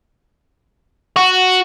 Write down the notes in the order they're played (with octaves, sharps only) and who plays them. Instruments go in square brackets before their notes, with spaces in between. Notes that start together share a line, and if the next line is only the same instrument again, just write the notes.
[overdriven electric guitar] F#4